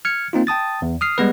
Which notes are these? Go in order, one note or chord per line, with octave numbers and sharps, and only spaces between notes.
F6 G#6 C#7
A#3 C4 D#4 F4
G5 A5 D#6 A6
E2
D#6 F6 C7
G3 G#3 B3 B4